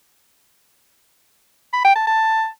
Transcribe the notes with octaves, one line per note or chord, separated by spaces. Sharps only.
B5
G5
A5
A5